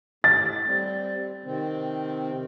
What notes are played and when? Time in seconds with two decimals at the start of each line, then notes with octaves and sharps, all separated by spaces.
0.24 A2 A6
0.66 G3 C4
1.45 C3 D#3 C4